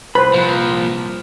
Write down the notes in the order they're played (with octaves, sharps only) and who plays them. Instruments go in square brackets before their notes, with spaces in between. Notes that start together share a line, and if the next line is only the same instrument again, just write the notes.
[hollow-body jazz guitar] C2 B5 [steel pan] B4 C5
[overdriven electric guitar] A#2 F3